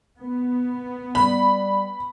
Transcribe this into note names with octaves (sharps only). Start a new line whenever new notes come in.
B3
G3 B5